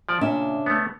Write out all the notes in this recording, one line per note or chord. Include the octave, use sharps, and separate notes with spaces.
F3 D5
A#2 C#3 D4 E5
A3 B3